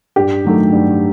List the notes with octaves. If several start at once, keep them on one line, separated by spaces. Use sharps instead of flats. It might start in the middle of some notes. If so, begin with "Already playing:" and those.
G2 G4
D#3 F#3 A3
G2